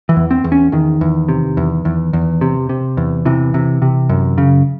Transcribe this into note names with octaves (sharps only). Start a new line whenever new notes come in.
E3
E2
C4
E2
C#4
E2 D#3
E2
C3
E2
E2
E2
C3
C3
E2
C3 E3
C3
C3
F#2
C#3